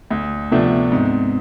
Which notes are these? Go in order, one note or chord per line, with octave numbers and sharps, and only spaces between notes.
D2
C3 F3 A3 B3 D4
G#2 C4